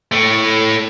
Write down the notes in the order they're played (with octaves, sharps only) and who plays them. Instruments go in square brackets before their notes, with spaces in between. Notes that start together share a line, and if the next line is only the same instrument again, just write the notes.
[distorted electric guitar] A2 A3